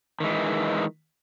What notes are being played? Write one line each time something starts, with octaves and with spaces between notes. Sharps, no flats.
D#3 E3 G#3